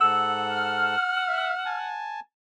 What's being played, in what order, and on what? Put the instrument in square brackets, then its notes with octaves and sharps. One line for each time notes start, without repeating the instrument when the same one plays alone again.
[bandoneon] G#2 A4 [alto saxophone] F#5 [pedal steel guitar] E6
[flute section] F6
[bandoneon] E5
G#5 A5